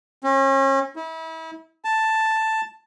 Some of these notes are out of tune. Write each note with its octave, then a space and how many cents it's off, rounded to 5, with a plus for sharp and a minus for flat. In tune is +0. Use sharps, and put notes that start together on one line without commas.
C#4 -35
E4 -35
A5 +5